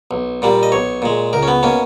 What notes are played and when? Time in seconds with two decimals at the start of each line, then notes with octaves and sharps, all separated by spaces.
0.11 B1
0.42 A#2 G3 A#3
0.63 D#5
0.72 B1 C#5
1.02 A#2 G#3
1.33 C#2 A#4
1.43 C#4
1.48 B3
1.63 B2 A#3 C#4